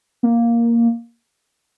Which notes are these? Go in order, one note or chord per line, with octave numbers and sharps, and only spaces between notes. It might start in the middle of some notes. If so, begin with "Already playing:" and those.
A#3